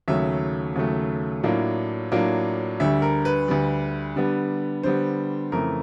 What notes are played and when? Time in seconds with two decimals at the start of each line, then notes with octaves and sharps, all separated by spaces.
0.08 D#2 C#3 F#3 A3 E5
0.76 D#2 C#3 F#3 A3
1.43 A2 F#3 A#3 D4 F4
2.12 A2 F#3 A#3 D4 F4
2.80 D2 D3 G3 E5
3.02 A#4
3.25 B4
3.48 D2 D3 G3
4.16 D3 G3 B3
4.83 D3 G3 B3 C5
5.52 F2 C#3 E3 A3 A#4